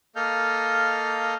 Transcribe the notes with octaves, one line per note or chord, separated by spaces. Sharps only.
A#3 A4 D#5 F5 F6 G6